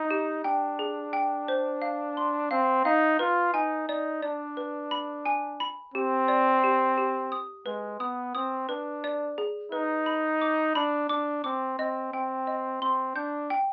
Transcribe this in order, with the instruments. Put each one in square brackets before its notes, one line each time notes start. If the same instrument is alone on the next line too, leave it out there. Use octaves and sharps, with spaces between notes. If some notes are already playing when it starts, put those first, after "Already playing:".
Already playing: [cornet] D#4
[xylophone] G4
[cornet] D4 [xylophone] G5
[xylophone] G#4
G5
C5
F5
C6
[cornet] C4 [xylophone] F5
[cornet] D#4 [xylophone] F5
[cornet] F4 [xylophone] B4
[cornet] D#4 [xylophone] G#5
[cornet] D#4 [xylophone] D5
[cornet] D4 [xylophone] D5
[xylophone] B4
B5
G#5
B5
[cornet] C4 [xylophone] G4
[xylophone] D5
G4
G4
D#6
[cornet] G#3 [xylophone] B4
[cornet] B3 [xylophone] D#6
[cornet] C4 [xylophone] D#6
[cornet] D4 [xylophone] B4
[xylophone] D5
G#4
[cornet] D#4 [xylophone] B4
[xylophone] B5
D6
[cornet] D4 [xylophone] B5
[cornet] D4 [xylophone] D6
[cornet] C4 [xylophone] D6
[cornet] C4 [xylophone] D#5
[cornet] C4 [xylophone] G5
[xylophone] D#5
[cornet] C4 [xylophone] C6
[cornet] D4 [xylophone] G6
[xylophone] G5